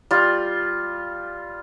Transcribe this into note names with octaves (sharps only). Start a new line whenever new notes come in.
G3 F4